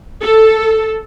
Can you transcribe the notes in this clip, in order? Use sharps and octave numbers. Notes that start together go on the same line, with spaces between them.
A4